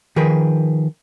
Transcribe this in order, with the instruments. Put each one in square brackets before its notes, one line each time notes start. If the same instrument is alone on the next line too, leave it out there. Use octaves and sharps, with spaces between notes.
[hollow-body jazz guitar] D#3 F3 G#4 A#4 B4